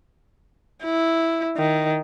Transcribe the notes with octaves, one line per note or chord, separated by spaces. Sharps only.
E4
D#3